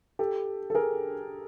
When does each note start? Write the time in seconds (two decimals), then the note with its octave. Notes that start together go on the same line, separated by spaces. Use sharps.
0.19 G4 A4
0.70 A4
0.74 G#4 A#4